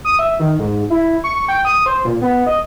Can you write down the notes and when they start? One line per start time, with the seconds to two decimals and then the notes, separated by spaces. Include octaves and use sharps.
0.05 D#6
0.19 E5
0.40 D#3
0.59 G#2
0.90 E4
1.24 C#6
1.49 G5
1.65 D#6
1.86 C5
2.05 A#2
2.21 B3
2.46 D#5